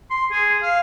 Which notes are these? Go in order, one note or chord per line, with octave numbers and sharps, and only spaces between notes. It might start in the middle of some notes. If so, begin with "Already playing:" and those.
C6
G#4
F5